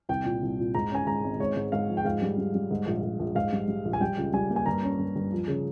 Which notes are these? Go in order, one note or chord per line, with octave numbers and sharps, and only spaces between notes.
C2 G5
A#2
C2
A#2
G#2 A#5
C#4 G#5
G#2 A#5
G#1
G#2 C#5
G#2
G#2 F5
F3
G5
G#2 F5
G3
G3
G3
G#2
A#1
A#1
A#1
G#2 F5
G3
G3
A#1
G#5
G3 G5
C#2
G3 G#5
A#3
G#5
G2 A#5
C#4
G2
G2
F3
C#3